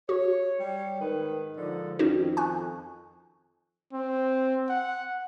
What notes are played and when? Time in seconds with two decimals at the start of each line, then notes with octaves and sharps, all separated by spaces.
0.09 F#4 C#5
0.59 G3 C#5
1.00 G#2 D#3 B4
1.57 G#2 D3 F3
1.99 F2 D#3 C#4 D#4 F#4
2.37 G#5 C#6 F#6
3.93 C4
4.69 F#5